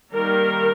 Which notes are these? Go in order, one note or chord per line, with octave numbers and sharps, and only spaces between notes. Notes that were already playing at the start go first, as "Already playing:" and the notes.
D#3 G3 A#3 A#4